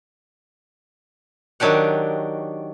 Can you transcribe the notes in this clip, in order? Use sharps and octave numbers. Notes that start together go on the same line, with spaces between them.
D#3 F#3 D4 G4 F#5